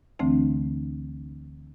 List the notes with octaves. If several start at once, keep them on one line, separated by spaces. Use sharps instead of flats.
D2 D3 E3 A3 C4 D4